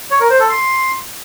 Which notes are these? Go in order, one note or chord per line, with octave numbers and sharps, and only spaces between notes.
C#5
A#4
C5
A4
C6